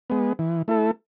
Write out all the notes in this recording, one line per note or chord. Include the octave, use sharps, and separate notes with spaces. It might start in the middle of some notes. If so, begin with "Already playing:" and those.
G#3 B3
E3
A3 E4 A4